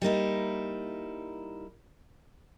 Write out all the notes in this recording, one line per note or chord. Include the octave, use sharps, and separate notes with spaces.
G3 A#3 D#4 E4